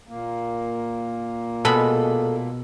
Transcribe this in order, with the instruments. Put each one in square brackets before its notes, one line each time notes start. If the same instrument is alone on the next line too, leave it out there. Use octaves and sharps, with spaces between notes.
[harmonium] A#2 A#3
[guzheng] B2 G#3 B5 [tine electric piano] A4